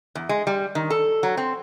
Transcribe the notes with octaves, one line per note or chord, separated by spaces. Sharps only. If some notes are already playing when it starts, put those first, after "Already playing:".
E2
G#3
G3
D#3
A4
F#3
C4